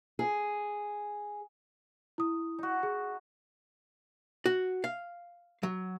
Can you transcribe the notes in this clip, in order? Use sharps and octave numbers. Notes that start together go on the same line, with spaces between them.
G#4
E4 D#6
D#4 F#4
G#4
F#4
F5
F#3